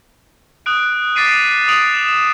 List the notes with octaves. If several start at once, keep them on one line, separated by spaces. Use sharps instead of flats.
D#6 F#6 D7
D6 A6 B6 C7 D7 D#7
D#6 D7 F7 F#7
E7